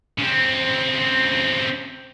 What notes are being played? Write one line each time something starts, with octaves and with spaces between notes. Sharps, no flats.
C#3 C4